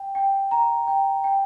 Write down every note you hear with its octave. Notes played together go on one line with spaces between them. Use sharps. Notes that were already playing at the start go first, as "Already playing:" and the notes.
Already playing: G5
G5
A#5
G5
G5